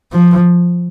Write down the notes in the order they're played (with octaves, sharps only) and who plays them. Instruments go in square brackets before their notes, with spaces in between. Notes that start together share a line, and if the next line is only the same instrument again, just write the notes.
[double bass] F3